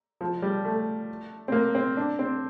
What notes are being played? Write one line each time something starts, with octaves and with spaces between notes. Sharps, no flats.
F3
G3
A3
C4
A#3
C4
D4
C4